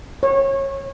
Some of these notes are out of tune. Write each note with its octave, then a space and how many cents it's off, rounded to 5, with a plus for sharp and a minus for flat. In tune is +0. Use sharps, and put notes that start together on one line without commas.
C#5 -20